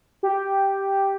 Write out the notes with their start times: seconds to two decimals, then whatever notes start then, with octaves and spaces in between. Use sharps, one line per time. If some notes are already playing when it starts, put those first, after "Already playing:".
0.23 G4